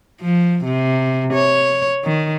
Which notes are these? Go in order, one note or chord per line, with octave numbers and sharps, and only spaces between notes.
F3
C3
C#5
D#3